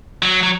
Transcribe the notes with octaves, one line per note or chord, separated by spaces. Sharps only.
F#3
F#3